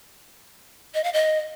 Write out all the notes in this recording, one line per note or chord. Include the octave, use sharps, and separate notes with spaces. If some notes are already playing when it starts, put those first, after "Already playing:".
D#5
F5
D#5